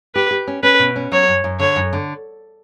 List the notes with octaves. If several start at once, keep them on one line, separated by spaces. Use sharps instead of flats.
G4 B4
G4
C#4
C#4 B4
B2
C#4
F#3 C#5
F#2
F#2
D3 C#5
F#2
D3